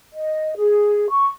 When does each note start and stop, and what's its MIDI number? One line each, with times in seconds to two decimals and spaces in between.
0.14 0.55 75
0.57 1.08 68
1.10 1.30 85